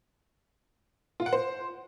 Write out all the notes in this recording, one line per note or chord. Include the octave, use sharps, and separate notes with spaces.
F4
F#5
C5